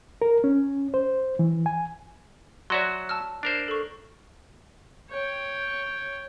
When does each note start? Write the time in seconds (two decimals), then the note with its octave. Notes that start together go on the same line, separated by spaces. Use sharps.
0.22 A#4
0.44 C#4
0.94 C5
1.39 E3
1.66 G#5
2.70 F#3 F#4 C#5 D5 E5 C6
3.09 A5 E6 F6
3.43 D4 A#4 C5
3.68 A4 C#6
5.10 C#5 G5